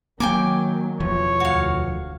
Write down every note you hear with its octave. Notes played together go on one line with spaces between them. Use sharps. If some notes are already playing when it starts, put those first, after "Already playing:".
D#3 F#3 A#3 G5 G#5 D6
E1 E3 F3 C#5
D2 F#4 F5